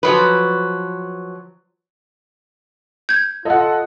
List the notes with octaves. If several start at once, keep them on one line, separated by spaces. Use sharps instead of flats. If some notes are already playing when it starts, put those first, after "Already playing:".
F3 F#3 B4
G6 G#6
F4 A4 D#5 F#5